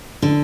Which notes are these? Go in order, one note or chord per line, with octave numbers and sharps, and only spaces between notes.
D3